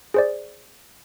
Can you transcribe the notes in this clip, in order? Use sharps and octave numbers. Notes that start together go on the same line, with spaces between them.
G#4 C5 D5